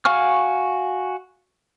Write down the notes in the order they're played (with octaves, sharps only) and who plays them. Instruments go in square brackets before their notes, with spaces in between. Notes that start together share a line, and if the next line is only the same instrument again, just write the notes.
[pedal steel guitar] F#4 F5 G#5 C#6 F6